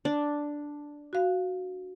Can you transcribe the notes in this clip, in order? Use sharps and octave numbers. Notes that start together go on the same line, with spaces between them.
D4
F#4 F5